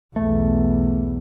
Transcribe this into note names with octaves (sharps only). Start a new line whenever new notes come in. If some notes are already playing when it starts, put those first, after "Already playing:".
B1 E2 A3